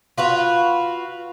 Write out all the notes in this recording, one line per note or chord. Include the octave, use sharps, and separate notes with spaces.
F4 F#4 B4